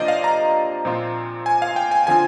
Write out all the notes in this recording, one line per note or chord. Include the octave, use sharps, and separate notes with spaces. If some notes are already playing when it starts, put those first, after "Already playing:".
Already playing: C3 F3 A#3 D4 F4 C5 D5 D#5
F5
A#5
A#2 F3 C4 F4
G#5
F5
G5
G#5
D3 F3 C4 F4 G#5